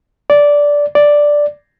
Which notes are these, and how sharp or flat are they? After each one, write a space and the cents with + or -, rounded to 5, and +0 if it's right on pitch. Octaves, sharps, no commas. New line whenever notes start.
D5 -10
D5 +0